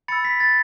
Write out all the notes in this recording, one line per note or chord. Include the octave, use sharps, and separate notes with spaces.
B5 E6 A6 C#7
B6
A6